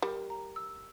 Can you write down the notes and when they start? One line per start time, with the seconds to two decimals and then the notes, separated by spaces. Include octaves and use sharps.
0.02 G3 A#4
0.30 A#5
0.56 E6